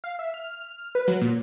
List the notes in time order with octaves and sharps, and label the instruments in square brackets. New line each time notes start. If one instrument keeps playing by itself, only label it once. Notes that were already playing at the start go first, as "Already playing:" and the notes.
[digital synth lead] F5
E5
F6
B4
F#3
A#2